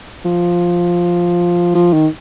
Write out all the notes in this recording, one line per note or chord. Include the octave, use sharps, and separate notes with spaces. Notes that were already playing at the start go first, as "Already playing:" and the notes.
F3
F3
D#3